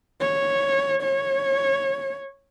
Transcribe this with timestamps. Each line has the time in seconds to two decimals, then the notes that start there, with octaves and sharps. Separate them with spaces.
0.21 C#5
1.03 C#5